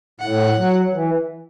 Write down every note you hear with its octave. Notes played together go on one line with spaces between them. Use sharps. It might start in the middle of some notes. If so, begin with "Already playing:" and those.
A2 F#5
F#3
E3